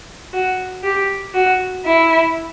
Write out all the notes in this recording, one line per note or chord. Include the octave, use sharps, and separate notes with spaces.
F#4
G4
F#4
E4